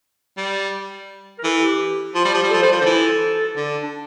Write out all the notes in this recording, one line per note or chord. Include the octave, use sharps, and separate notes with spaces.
G3
A#4
E3 A4
G4
F3 F4
G3
F3 G4
G3
A4
F3
G3 C5
F3 C5
D3
E3 A4
D3
D4